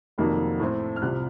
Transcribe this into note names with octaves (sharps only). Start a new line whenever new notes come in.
F1 F2 D#3 F#3 A#3
A2 A3 C4
F6
C2 C3 F3 F#6